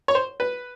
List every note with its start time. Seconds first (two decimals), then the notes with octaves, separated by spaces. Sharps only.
0.08 C#5
0.15 C5
0.40 B4